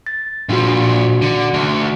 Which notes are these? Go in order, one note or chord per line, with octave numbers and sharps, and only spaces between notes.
A6
A#2 F3 D4 F#4
D3
D2